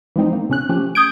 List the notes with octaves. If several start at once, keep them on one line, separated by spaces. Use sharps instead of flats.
E3 F3 G#3 C4 D#4
A#3
C3 C#4 F#6
F3 A3 C#4 G4
D#6 G6 G#6 D7